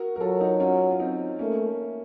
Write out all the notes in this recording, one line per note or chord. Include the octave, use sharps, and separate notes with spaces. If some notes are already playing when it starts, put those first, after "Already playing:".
Already playing: F#4 A#4
A#4
F#3 F4 A4
D#4 F#4
C#4 F4
F4
C4 D#4
A3 A#3 C#4